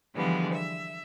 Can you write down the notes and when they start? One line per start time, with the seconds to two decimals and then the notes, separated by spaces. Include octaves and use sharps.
0.15 D3 E3 F3 G3 G#3 B3
0.52 E5